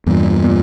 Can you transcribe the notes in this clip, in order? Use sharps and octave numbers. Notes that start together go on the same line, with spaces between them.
E2 G2 A#2
A#2